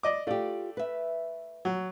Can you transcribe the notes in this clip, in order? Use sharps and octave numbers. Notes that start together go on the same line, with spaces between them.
D5 D#5 D6
A3 F4 G4 D5
B4 E5
F#3